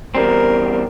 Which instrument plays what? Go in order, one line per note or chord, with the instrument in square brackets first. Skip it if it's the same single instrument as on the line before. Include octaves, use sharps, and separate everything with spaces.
[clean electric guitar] E2 G3 C4 [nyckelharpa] A#4